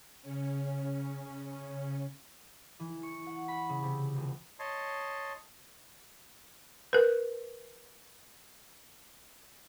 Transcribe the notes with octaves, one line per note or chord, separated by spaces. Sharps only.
C#3 C#4
E3
C#6
F#5
B5
C#3
C3
D#1
C#5 D#5 A5 C6
A#4 B4